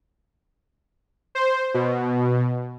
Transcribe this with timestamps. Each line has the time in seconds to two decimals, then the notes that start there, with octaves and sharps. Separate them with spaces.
1.35 C5
1.74 B2